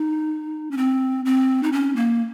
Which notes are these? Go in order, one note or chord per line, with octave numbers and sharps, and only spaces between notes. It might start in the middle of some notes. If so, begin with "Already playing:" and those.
Already playing: D#4
C#4
C4
C4
D#4
C#4
A#3